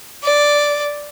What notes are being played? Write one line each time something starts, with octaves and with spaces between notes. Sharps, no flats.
D5